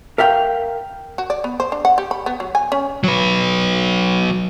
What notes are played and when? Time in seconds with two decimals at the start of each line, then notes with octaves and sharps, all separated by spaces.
0.18 A#4 E5 F5 G5
1.18 F#4
1.30 D5
1.44 B3
1.60 C5
1.72 D4
1.85 F#5
1.98 G4
2.11 B5
2.26 B3
2.40 F#3
2.55 G#5
2.72 C#4
3.04 F#3 B4